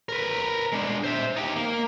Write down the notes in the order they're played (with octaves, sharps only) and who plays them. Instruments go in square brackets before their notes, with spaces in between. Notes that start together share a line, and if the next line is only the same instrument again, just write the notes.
[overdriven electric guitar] A#4 B4
G#3 D4
C5 E5
D#4 G4
A#3